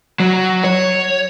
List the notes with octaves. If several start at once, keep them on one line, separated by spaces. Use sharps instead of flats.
F#3
C#5